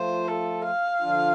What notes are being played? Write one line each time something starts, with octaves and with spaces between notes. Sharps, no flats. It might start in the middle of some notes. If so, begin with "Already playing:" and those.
Already playing: F3 A3 F4 C5
A4
F5
D3 F3 D4 F4